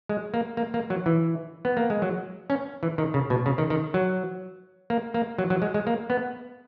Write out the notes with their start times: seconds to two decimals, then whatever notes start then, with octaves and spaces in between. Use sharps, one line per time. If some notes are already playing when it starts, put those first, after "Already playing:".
0.09 G#3
0.34 A#3
0.57 A#3
0.74 A#3
0.90 F#3
1.06 E3
1.65 B3
1.77 A#3
1.90 G#3
2.02 F#3
2.50 C#4
2.83 E3
2.98 D#3
3.14 C#3
3.30 B2
3.46 C#3
3.58 D#3
3.70 D#3
3.94 F#3
4.90 A#3
5.14 A#3
5.38 F#3
5.50 F#3
5.62 G#3
5.74 G#3
5.87 A#3
6.10 B3